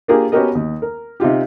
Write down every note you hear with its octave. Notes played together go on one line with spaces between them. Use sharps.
A#3 D4 F4 G4 G#4 A#4
B3 C#4 F#4 G4 A#4 D#5
D#2
A#4
C3 D#4 F4 G4